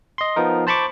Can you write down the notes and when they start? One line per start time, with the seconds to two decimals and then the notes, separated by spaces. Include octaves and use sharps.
0.18 D#5 C6
0.36 F3 B3 D#4 A#4
0.67 C5 A5 B5 C#6 D6